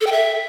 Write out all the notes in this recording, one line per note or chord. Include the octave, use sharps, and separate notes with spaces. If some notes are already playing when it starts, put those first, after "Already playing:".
A4
G5
E5